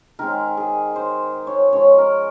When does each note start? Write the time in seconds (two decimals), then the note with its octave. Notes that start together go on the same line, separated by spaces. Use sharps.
0.19 D#3 G#3 C4 A#4
0.57 G#4
0.96 C5
1.47 C#5
1.72 F3 G#3 C#4 C#5
1.98 A#4